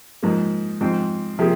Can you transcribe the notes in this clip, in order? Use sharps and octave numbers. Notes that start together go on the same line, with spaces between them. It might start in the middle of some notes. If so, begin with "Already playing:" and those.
G#2 F3 A#3
G#2 F3 C4
C3 F3 A#3 G#4